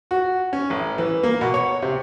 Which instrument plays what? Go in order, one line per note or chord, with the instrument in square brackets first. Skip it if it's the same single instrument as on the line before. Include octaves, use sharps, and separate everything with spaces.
[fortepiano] F#4
C#4
A1
E3
A#3
B2
C#5
C3